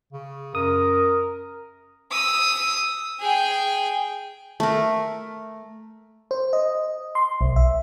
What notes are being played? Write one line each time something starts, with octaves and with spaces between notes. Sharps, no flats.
C#3
F#2 A#4 D#6
D#6 E6
G#4 G5
A3 A#4
C5
D#5
C6
B1
E5